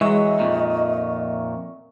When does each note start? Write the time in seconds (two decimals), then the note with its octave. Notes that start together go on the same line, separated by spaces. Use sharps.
0.01 E3 F#3 G#3 D#5 E5 C#6
0.39 F2 A#2 D#3